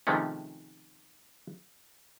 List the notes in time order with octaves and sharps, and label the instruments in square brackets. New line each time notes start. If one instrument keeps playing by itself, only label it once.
[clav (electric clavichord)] C3 D#3 F3 G#3 A3 C#4